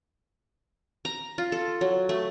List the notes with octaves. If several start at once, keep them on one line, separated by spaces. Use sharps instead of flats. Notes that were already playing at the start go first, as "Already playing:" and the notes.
A#5
F4
A4
F#3
A3